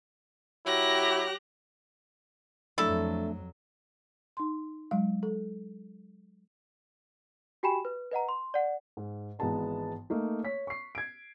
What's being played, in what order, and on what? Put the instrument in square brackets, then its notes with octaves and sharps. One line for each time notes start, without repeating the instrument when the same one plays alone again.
[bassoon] F#3 [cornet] E4 [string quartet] G4 F#6 A#6
[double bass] F2 F#3 [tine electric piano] A3 D4 [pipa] E4 A4
[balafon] D#4 C6
F#3 G#3 F5
A4
[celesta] F#4 G4 G5 G#5 B5 E7
B4
B4 D#5 F#5 A#5
C6
D5 F#5
[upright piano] G#2
G#1 E3 G#3 B3 A5 A#5
A3 A#3 D#4
C#5 B6
C#6 C7
G#6 D7